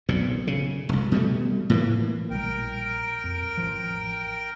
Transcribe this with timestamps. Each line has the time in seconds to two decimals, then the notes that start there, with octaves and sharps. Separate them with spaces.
0.09 B1 F2 A#2
0.47 C#3
0.89 F1 C2
1.12 B2 G3 A3
1.70 A2 E3 A#3
2.30 A#1 B2 G3 A#4 G5
3.24 F2
3.57 A1 A2 F3